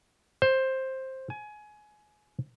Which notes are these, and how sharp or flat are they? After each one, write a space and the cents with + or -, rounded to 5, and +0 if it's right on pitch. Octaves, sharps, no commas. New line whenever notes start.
C5 +10
G#5 +20